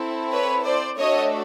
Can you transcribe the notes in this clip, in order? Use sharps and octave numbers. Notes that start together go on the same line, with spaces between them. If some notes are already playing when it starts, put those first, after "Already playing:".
Already playing: C4 E4 A4
B4 C#5
C5 D5
A3 D4 F#4 A4 C#5 D#5